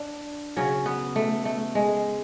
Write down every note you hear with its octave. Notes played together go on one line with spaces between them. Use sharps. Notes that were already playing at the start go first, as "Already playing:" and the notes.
Already playing: D4
C#3 F#3 C#4
B3
A3
A3
G#3